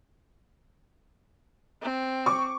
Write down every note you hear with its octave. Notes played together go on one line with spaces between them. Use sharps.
C4
C#6 D6